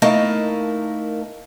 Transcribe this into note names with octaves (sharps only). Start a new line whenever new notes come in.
A3 A#3 D#4 E4 A#4 A5